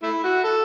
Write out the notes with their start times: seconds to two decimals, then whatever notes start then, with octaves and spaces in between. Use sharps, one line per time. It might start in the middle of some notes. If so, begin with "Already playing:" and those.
0.03 A3 E4
0.24 F#4
0.44 A4